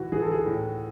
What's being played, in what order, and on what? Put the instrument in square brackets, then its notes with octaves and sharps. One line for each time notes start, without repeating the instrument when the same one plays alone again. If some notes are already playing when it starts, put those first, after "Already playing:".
Already playing: [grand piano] A2 E3 F#4
E3 G#4
A4
G#4
A2